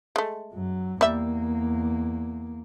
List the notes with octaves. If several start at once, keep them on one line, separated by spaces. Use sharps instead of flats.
G#3 A3
F#2 F#3
E2 G3 A#3 E5